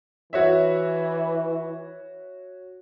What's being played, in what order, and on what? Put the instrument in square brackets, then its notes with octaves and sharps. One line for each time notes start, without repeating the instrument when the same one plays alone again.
[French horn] E3 [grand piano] F#4 C#5 E5